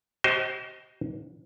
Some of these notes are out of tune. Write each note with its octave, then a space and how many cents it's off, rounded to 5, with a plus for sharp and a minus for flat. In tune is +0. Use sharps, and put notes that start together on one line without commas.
G4 -45 C5 +10 D#5 +15